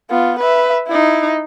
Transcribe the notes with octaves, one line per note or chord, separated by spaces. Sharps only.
B3 F4
B4 E5
D#4 E4